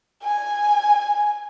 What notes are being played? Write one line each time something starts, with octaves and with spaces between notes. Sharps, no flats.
G#5